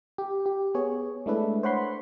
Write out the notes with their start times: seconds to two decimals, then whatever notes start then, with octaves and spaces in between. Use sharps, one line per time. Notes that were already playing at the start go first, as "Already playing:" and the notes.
0.18 G4
0.46 G4
0.75 B3 G#4 C#5
1.26 G#3 A3 D4 E4 A4 B4
1.63 C5 C#5 F#5 B5 C6